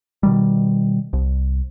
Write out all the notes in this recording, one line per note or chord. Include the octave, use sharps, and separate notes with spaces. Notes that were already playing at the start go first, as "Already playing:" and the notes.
B2 D#3 G3
C2